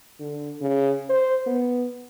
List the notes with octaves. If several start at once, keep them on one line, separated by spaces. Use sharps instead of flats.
D3
C#3
C5
B3